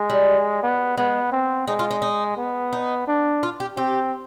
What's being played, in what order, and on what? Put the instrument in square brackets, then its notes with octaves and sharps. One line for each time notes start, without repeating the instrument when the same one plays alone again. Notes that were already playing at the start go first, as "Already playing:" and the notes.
Already playing: [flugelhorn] G#3
[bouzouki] G3
[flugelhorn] B3
[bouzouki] G#3 [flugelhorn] B3
[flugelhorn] C4
[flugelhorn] G#3 [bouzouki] D#4
[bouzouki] F4
D#4
D#4
[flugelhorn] B3
[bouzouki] D#4
[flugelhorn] D4
[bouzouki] F4
G4
[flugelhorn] C4 [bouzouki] G4